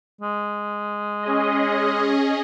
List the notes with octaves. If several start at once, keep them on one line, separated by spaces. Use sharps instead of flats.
G#3
C#4 G#4 D#5